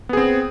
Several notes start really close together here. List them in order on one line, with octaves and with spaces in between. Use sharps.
B3 G#4 C4